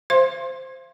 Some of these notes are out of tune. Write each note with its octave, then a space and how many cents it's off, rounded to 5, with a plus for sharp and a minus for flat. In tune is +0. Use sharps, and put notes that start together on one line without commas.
C5 +0 F5 -40 C6 +20